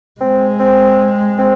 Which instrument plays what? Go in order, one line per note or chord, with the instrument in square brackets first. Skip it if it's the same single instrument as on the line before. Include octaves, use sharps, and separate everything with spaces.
[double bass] G#3 [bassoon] C4
[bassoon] C4
C4